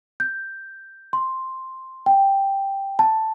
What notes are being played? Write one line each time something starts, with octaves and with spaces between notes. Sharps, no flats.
G6
C6
G5
A5